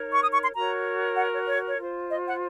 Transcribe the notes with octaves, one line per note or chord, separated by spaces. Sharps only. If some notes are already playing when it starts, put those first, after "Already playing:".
Already playing: D#4 A#4 C#5
C#6
D#6
C#6
C6
F#4 A#4 C#5 A#5
F#5
C#5
C#5
C#5
F4 C5
D#5
F#5